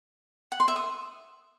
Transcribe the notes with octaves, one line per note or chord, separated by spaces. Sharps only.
F#5
C6
E5
D#6